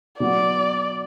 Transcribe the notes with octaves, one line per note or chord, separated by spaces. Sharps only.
B2 F#3 B3 F#4 D5